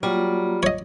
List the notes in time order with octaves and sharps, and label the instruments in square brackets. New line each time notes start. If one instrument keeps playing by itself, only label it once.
[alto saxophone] F#3 [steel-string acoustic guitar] G3 [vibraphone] A#3 F4
[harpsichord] C#5 D#5